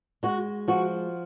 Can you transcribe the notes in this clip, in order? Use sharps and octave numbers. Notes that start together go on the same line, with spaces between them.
G#3 F#4
F3 F#4